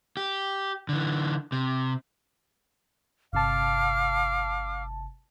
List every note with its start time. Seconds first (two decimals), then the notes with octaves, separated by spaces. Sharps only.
0.17 G4
0.89 D3 E3
1.52 C3
3.33 G1 C3 F5 A5 D6 F6